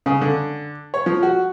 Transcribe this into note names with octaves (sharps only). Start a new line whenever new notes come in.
C#3
D3
C#5
F3
F#4